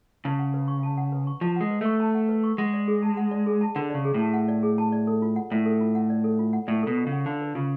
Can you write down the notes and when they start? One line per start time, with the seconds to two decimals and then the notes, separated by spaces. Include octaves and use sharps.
0.25 C#3 A5
0.39 F#5
0.54 B4
0.68 C#6
0.83 A5
0.98 F#5
1.12 B4
1.27 C#6
1.41 F3 A5
1.56 G#3 F#5
1.71 B4
1.81 A3 C#6
2.00 A5
2.15 F#5
2.29 B4
2.43 C#6
2.58 G#3 F#5
2.73 D5
2.88 G#4
3.03 A5
3.17 F#5
3.31 D5
3.46 G#4
3.61 A5
3.75 D3 F#5
3.90 C#3 D5
4.05 G#4
4.14 A2 A5
4.34 F#5
4.48 D5
4.63 G#4
4.78 A5
4.92 D5
5.07 A4
5.22 F4
5.36 F#5
5.51 A2 D5
5.66 A4
5.81 F4
5.95 F#5
6.10 D5
6.24 A4
6.39 F4
6.53 F#5
6.67 A2 D5
6.83 B2 A4
6.97 F4
7.07 C#3
7.12 F#5
7.26 D3 F5
7.42 B4
7.55 C#3 F4